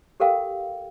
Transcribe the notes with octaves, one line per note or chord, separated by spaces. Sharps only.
G4 A4 A#4 F5 G5